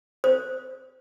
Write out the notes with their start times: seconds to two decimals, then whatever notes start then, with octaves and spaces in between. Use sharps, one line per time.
0.24 C5